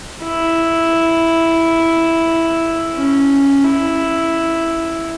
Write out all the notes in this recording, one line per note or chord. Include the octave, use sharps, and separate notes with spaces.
E4
C#4
E4